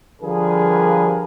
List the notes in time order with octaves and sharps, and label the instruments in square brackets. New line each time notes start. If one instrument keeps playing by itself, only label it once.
[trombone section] D3 F3 G3 G#4 A#4 B4